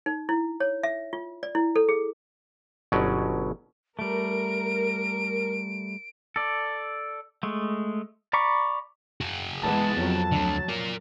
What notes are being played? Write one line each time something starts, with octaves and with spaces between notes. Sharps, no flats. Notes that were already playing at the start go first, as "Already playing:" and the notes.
D#4
E4
C#5
E5
F4
D5
E4
A4
G#4
G1 B2 F#3 C#4 D5 D#5
G3 A3 A#4 D7
A4 D5
G#3 A3
D5 A#5 B5 C#6 D6
F#4 G#4
E3 G#3 B3 A5
F2 F#3
D2 D3 F#3
A#4 D5